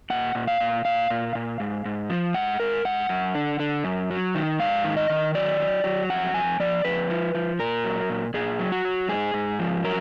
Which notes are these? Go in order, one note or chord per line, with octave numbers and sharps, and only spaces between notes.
A#2 F#5
A#2
F5
A#2
A#2 F5
A#2
A#2
G#2
G#2
F3
G#2 F#5
G#2 A#4
G#2 F#5
F#2
D3
D3
F#2
F#3
D#3
G#2 F5
D#3
D#5
D#3
F#3 D5
F#3
F#3
F2 F#5
F2 G#5
F3 D5
F2 B4
F3
F3
A#2 A#4
F#3
A#2
A#2 G#4
F#3
F#4
F#3
G#2 G#4
G#2
F3
F#3 A#4